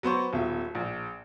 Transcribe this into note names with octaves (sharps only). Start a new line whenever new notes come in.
F#3 B3 C5 C#6
D#1 B2 E5
A#1